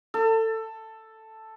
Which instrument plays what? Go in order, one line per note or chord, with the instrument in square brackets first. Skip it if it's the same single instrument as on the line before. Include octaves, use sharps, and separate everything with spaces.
[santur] A4